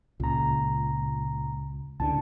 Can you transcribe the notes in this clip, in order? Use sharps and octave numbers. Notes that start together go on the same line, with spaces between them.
C#2 A#2 A#5
C#2 A2 D3 A5